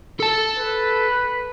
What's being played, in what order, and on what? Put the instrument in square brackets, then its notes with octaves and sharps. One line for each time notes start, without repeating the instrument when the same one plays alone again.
[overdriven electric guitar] A4 A5
[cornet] B4